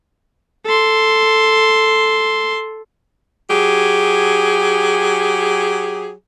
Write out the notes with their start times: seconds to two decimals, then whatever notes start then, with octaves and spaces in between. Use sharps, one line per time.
0.66 A4 C6
3.50 F#3 G4 G#4